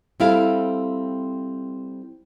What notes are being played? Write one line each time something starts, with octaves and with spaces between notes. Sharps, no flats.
G3 C4 E4 A4 F5